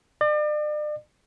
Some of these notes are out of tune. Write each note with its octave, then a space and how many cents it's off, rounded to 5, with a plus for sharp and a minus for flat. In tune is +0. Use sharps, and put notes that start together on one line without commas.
D5 +40